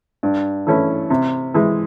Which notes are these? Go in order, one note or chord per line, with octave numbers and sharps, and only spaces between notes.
G2
E3 A3 C#4 E4
C3
E3 G#3